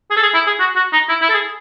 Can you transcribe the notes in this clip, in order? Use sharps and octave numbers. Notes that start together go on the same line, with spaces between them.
G#4
A4
G#4
E4
G#4
F#4
F#4
D#4
E4
E4
A4
G#4